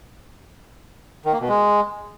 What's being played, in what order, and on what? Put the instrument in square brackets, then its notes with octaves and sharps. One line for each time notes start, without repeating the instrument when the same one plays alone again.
[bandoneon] D#3
A#3
B2
G#3